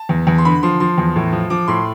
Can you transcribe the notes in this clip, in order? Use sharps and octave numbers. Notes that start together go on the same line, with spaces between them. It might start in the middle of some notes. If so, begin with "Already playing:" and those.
Already playing: A5
E2
E2
C6
D3 B5
F3 C6
F3 C6
E2
A2
F3
F3 D6
A2 C6